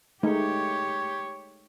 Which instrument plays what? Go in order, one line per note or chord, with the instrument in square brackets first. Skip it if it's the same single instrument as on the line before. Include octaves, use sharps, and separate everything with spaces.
[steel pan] G#3 A3 D#4 [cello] G4 C#5